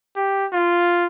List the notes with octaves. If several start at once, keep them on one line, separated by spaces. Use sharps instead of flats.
G4
F4